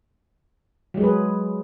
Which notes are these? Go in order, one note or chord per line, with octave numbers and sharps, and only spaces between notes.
F#3 G#3 G#4 B4